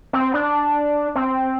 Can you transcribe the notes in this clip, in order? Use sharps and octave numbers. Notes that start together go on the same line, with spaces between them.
C4
D4
C4